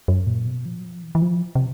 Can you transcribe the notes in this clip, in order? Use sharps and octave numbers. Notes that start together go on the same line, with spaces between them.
F#2
A#2
B2
F3
F#3
F3
E3
E3
F3
C3